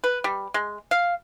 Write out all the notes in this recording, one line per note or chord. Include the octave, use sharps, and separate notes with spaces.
B4
G3
G#3
F5